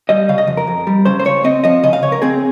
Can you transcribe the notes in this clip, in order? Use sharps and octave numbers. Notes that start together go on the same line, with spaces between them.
G3 D#5
C#3 F5
D#5
F2
A#4
F2
G3
C#3 C5
C5
C#2 C#5
C4 D#5
F3 D#5
C#3 D#5
F5
C#2 C#5
A#4
C4 G#4